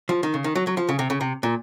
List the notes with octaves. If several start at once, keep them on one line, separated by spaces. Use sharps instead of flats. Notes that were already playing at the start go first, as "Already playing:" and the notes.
F3
D#3
C#3
D#3
F#3
F#3
F3
C#3
C3
C#3
C3
A#2